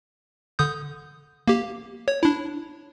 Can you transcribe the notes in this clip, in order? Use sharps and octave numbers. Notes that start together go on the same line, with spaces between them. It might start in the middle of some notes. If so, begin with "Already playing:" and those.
D3 D#6 G6
A#3 G4
C#5
D4 E4